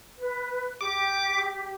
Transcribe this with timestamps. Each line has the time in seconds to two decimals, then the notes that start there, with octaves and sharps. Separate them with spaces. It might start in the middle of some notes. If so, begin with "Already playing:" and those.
0.17 B4
0.81 G4 D6